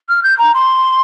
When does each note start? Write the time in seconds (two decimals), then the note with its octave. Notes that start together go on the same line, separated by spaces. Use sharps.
0.09 F6
0.23 G6
0.38 A#5
0.54 C6